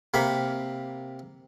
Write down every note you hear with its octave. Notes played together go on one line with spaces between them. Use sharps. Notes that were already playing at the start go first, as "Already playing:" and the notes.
C3 A#3 B5